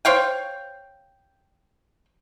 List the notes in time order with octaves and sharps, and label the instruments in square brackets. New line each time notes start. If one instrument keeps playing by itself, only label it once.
[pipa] C5 C#5 F5 G5